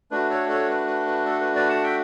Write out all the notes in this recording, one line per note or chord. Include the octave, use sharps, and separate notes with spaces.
A3 D4 F#4 B4
A4 C#5
A4 C#5
B4
B4
B4
A4
B4
B4 D5
F#5 A5
E5 G5